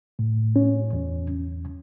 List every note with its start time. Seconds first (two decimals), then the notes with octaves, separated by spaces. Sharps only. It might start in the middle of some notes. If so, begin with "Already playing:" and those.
0.19 A2
0.56 C#4
0.93 E2